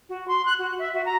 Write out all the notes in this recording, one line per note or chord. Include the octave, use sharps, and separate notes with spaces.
F#4
C6
F#6
F#4
E5
F#4
A#5